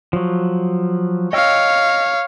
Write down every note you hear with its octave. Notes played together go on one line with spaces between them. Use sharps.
F3 F#3
C#5 D#5 F5 G5 E6